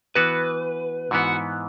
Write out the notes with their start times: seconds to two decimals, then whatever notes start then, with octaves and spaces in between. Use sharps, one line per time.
0.15 E3 B3 F#4 B4
1.11 G#2 E3 B3 F#4